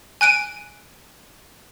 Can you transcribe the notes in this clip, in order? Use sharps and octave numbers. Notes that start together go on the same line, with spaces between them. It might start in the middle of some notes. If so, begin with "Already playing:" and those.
G#5 F#6 D7 D#7